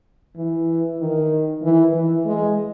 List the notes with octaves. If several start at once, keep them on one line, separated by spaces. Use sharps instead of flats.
E3
D#3
E3
E3
G#3